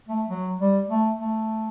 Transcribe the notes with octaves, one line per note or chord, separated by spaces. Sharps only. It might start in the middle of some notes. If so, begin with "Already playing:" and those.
A3
F#3
G3
A3
A3